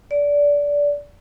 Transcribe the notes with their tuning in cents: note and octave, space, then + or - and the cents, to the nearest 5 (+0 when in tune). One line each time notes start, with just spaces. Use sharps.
D5 -20